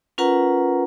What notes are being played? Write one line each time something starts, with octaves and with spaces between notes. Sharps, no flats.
C#4 F4 A#4 B4 F#5 A#5